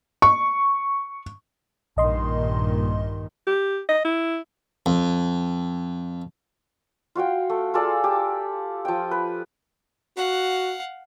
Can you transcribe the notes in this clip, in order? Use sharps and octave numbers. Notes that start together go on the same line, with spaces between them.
C#6
A#1 G2 A#2 D#3 D#5 C6
G4
D#5
E4
F2
F4 F#4 F5 G5
A3
F4 G#4 A4 D5
G4
F3 G5
B4
F#4 F5 F#5